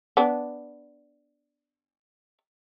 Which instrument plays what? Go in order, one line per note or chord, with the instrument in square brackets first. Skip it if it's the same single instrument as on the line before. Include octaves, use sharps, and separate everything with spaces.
[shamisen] B3 D4